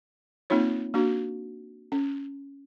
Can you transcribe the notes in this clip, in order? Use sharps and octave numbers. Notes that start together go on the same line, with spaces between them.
A#3 C4 D#4 F4 C#5
A#3 D4 F#4
C#4